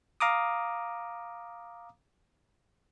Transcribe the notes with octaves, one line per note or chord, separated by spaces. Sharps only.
F5 A#5 D6 D#6